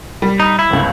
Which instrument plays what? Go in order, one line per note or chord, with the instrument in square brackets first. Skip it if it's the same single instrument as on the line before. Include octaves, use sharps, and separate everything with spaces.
[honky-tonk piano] G3
[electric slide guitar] D#4
E4
[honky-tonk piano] G1 C#2